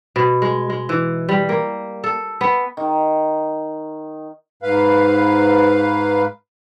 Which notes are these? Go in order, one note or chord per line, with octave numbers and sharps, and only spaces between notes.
B2
G#3
G#3
E3
G3
A#3
A4
B3
D#3
G#2 B4 F5